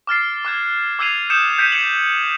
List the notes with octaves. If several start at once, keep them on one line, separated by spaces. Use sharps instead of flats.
D6 F6 A6 C7
D6 F#6 G#6
D6 E6 G#6 C7 D#7 F7
D#6 G6 C#7 E7
G6 G#6 B6 C#7 D#7
C#7 F#7